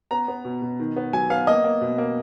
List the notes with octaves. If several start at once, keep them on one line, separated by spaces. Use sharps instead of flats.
B3 A#5
B3
B2
B2
D#3
B3
F#3 G#5
B3 F5
A#3 D#5
A#3
B2
A#3